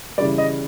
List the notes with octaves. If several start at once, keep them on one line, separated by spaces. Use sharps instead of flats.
C#3 E3 G3 D5
D#5